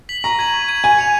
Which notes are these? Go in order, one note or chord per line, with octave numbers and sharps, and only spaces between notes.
B6 F#7
A#5 C#6
G#6 D#7 F#7
C#6
G#6 D#7 F#7
G#5 G#6
C#7 F7